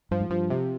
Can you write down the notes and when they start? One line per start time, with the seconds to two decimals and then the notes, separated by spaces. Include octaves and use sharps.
0.11 G2 F3
0.21 G#2
0.30 G2 F3
0.50 C3